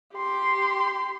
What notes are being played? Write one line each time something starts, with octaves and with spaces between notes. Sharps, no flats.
G4 C6